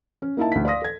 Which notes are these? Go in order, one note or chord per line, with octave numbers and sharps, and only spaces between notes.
C#4
A#3 D#4 E4 E5 A5
D2 B6
D5 F5 C6 D#6 A#6
A4 G#6